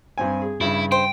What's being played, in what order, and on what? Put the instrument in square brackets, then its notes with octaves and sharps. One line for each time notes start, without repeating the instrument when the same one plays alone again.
[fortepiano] G2 C4 G#5
G#4
[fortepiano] G2 C#3 [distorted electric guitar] E4
[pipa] C5 [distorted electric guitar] G5